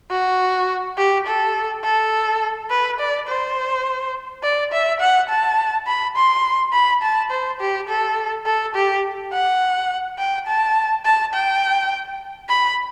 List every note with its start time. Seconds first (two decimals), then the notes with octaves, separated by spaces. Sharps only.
0.11 F#4
0.97 G4
1.26 A4
1.84 A4
2.70 B4
2.99 D5
3.28 C5
4.43 D5
4.72 E5
5.00 F#5
5.29 A5
5.87 B5
6.16 C6
6.73 B5
7.02 A5
7.31 C5
7.60 G4
7.88 A4
8.46 A4
8.75 G4
9.33 F#5
10.18 G5
10.47 A5
11.05 A5
11.33 G5
12.49 B5